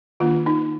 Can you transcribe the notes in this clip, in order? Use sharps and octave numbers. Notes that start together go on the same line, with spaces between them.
D#3 A#3 D4 F4
D#4